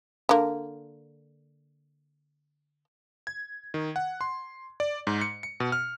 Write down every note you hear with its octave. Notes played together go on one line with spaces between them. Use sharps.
D3 A#3
G#6
D#3
F#5
C6
D5
G#2
C#7
C#7
B2
F6